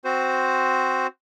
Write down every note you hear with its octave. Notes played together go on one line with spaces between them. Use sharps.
C4 F#4 C5